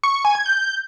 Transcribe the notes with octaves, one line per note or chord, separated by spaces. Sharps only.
C#6
C#6
G#5
G#6
G6